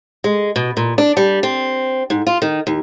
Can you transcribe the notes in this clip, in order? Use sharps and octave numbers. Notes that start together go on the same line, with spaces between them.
G#3
B2
A#2
D4
G3
C4
G#2
F4
D#3
D#2